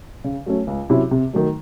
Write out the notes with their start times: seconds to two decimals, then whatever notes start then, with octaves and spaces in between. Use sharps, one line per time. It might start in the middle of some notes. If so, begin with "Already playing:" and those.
0.24 C#3
0.46 F#3 A3 C#4
0.67 C#2
0.90 C3 F#3 C#4 E4
1.11 C3
1.33 D#3 F#3 A3